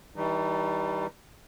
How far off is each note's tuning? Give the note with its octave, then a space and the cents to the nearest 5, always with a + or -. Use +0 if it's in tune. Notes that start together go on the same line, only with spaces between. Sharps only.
E3 -40 G3 +0 D#4 -30